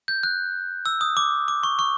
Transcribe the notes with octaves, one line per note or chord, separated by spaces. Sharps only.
G6
F#6
E6
D#6
D6
D6
C#6
C#6